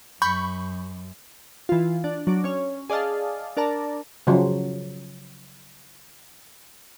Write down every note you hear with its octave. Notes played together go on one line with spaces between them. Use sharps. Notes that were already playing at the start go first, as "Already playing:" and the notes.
F#2 B5 C#6 G6
E3 F4
D4
F#3 D4 D6
C#4 C#5
G#4 D5 D#5 F5 A5
D4 A#4 D5 A5 A#5
C#3 F3 F#3